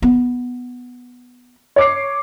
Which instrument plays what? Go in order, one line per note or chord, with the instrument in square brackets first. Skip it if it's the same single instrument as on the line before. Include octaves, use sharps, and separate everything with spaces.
[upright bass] B3
[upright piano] C#5 D6 C7